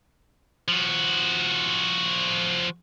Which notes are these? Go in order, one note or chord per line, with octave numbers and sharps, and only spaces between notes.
F3 F#4